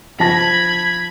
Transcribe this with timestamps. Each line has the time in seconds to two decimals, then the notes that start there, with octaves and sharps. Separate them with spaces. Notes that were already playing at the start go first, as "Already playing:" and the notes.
0.20 F3 A5 B5 G#6 A#6